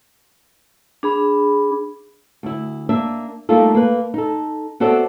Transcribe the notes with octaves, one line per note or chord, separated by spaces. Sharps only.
D4 G#4 B5
D2 E4
A#3 D4 E5
G3 A3 A#3 D#4 F4 A4
A#3 B4
D#4 A4
B3 C4 F#4 A4 D5 E5